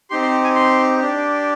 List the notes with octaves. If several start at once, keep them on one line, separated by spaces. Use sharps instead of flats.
C4 D#4 G4 C6
C6
G#5
C6
D4 G4